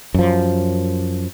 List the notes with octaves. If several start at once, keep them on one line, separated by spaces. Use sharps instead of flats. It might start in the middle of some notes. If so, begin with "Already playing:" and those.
F#2 F3